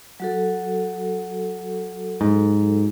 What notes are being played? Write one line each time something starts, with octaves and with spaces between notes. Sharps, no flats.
F#3 F#4 A4
G#2